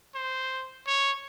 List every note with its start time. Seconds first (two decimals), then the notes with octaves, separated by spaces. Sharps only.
0.15 C5
0.86 C#5